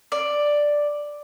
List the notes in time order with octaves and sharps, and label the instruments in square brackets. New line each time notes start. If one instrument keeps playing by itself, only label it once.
[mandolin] D5